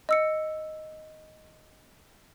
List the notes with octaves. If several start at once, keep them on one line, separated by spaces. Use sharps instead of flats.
D#5 E6 C#7